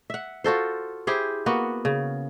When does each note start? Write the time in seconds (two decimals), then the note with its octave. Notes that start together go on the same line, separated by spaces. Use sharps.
0.10 E5 F#5
0.44 F4 F#4 A4 C5
1.07 E4 G4 G#4 C5
1.46 A#3 B3 F#4
1.85 C#3